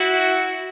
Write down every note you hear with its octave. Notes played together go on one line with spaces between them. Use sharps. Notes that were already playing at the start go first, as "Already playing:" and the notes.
Already playing: E4 F#4